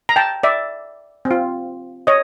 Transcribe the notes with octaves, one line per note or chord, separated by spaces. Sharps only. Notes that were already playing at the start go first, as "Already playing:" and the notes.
A#5
G5 A5
D5 E5
C4
F4
C#5 D#5